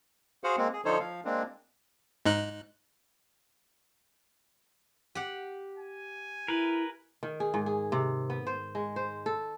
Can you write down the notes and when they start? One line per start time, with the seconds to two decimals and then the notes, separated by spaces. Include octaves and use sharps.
0.44 F#4 G#4 C5 F5 F#5
0.57 G#3 A#3 C4
0.73 G#4
0.85 D3 F3 D#4 A4 C5 C#5
1.00 F3 F5
1.25 G#3 A#3 C4 D4
2.25 G#2 D#4 F#6
5.15 G4 F#5
5.77 G#5
6.48 E4 A#4 B4
7.23 D#3
7.40 G#4
7.54 G#2
7.66 G#4
7.92 C3
8.30 B3
8.47 C5
8.75 G#3
8.96 C5
9.26 A4